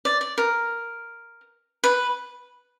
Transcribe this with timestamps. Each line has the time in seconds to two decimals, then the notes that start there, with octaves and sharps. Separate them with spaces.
0.05 D5
0.21 D5
0.38 A#4
1.84 B4